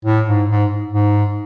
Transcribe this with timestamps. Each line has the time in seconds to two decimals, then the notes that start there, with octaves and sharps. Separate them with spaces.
0.05 A2
0.28 G#2
0.50 G#2
0.93 G#2